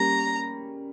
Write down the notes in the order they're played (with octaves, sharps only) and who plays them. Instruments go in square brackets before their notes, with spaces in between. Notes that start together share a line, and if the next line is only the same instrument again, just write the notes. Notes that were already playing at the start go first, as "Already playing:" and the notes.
Already playing: [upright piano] G3 A#3 C#4 [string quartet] A#5